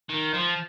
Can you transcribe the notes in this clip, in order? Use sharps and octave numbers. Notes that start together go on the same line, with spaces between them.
D#3
F3